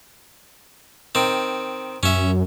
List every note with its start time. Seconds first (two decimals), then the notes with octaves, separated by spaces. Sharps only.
1.15 D#3 C4
2.03 F#2 C#4 E5